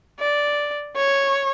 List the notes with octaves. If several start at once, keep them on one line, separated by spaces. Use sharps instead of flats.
D5
C#5